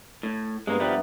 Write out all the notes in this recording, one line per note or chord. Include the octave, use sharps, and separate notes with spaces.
A2
G2 G#3 A#3 B3 A#5
F3 G3 B3 B4 E5